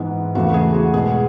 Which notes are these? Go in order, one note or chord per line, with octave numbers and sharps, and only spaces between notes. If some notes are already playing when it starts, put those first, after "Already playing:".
Already playing: G#2 E3 G#3 B3
E2 C#3 E3 A3 F#4
G#4
F#4
B2 G#3 B3 G#4